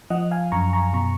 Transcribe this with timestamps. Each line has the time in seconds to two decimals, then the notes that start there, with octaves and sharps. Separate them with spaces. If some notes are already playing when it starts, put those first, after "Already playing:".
0.10 F3 D#5 F#5
0.31 F5 G#5
0.52 F#2 A#5 C#6
0.73 A#5 C#6
0.93 B2 A#5 C#6